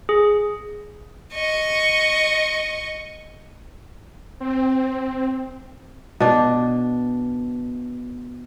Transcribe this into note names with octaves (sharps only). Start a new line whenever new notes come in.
G#4
D#5 C#6
C4
B2 D4